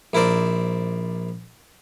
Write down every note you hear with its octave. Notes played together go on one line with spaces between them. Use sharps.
A#1 E4 A#4 C5 D5